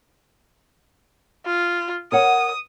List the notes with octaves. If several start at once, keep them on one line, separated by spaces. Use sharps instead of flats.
F4
A#4 C#5 F#5 D#6